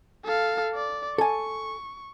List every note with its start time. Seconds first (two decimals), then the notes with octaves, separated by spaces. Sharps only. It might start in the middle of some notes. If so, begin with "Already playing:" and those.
0.24 A4 F5
0.74 D5
1.18 A4 G#5 C#6